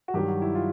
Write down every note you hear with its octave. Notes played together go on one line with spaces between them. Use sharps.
F#4
G2 D#3 F#3 G4
F#4
E4
F4